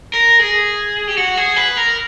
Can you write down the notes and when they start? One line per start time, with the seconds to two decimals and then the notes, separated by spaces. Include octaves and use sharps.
0.14 A#4
0.40 G#4
1.08 G4
1.18 F#4
1.37 G#4
1.56 B4
1.77 A#4